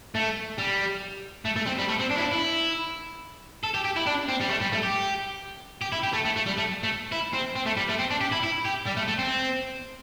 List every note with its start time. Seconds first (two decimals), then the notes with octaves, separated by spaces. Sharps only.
0.15 A3
0.58 G3
1.45 A3
1.56 A3
1.66 C4
1.79 G3
1.89 A3
2.00 C4
2.11 D4
2.17 E4
2.21 D4
2.33 E4
3.63 A4
3.74 G4
3.85 G4
3.96 E4
4.06 D4
4.28 C4
4.40 G3
4.50 A3
4.61 G3
4.73 A3
4.83 G4
5.81 G4
5.92 E4
6.04 G4
6.13 A3
6.25 A3
6.36 A3
6.46 G3
6.57 A3
6.83 A3
7.12 E4
7.34 C4
7.56 C4
7.66 A3
7.77 G3
7.89 A3
7.99 C4
8.11 D4
8.21 G4
8.32 E4
8.43 E4
8.65 G4
8.87 G3
8.97 A3
9.08 A3
9.19 C4